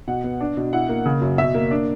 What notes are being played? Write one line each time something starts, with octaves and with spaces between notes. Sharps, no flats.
B2 F#5
B3
D4
B2
E4 F#5
A#3
C#3
F#2
B2 E5
A#3
D4